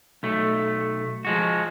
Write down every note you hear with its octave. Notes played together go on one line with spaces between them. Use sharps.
B1 A3
F3 G#3 F#4